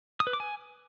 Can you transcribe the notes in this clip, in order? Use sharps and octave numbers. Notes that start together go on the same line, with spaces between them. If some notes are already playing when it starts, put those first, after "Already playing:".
D#6
B4
D6
G#5